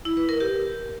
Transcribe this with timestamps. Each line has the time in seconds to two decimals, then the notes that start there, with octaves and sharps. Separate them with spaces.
0.05 E4
0.17 B4
0.29 A#4
0.40 G4